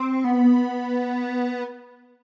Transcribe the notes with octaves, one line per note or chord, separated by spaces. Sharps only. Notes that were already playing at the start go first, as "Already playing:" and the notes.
Already playing: C4
B3